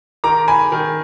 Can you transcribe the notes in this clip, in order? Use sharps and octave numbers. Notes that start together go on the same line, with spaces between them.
D#3 A#5 D6
G#5 B5
D#3